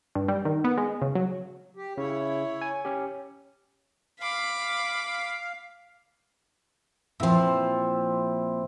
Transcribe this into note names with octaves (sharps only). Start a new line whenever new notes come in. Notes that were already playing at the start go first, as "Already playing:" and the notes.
G2
G3
D#3
B3
G#3
C#3
F#3
G4
C#3 E4 C#5
G#5
C#4 G4
F5 B5 D6
A#2 F3 C4 E4 E5